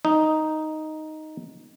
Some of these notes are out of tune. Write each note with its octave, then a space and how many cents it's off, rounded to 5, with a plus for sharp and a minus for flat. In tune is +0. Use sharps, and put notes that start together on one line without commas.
D#4 +0